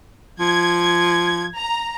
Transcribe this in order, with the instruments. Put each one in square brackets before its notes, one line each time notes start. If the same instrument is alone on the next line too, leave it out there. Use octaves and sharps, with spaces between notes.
[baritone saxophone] F3 [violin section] G#6
[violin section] A#5